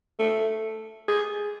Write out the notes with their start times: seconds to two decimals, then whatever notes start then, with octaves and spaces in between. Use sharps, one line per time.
0.19 A3
1.08 G#4